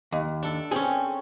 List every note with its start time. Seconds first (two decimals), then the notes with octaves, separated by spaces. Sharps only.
0.12 D#2
0.43 D4 A4
0.71 C4 C#4 G#4